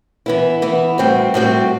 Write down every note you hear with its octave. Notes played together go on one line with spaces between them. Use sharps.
E3 B3 E4
E3 B3 E4
A2 G3 C4 F#4
A2 G3 C4 F#4